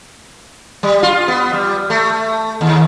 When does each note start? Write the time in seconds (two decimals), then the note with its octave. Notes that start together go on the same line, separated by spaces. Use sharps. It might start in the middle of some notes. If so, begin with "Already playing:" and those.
0.83 G3
1.03 F4
1.28 B3
1.53 G3
1.90 A3
2.61 D#2